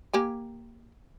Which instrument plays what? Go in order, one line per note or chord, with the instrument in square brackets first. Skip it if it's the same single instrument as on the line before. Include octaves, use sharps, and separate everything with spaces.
[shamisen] A#3 G4 G#5